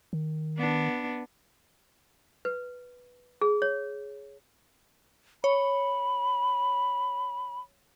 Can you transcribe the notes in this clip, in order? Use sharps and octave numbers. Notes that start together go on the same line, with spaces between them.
D#3
B3 D4
B4
G#4
C#5
C#5 B5